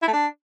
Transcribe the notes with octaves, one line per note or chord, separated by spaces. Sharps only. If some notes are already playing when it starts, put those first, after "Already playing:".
E4
A3
D4